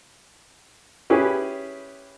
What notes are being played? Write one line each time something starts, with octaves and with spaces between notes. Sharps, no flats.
C#4 E4 G4 G#4 B4 C#5